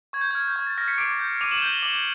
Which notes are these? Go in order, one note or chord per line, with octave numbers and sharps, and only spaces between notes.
C#6 G#6
G6
F6 G#6
G6
C#6 G#6
A6
F6 A#6
B6 C#7
D6 C7 D7
G6
D6 D#7 F7
E7 F#7
G6 F7 G7
F7 G7
D6 E7 F#7